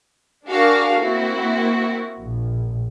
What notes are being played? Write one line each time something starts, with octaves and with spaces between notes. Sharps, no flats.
D4 F#4 G#4 A#4 F5
A#3 C4 E4 F#4
A#1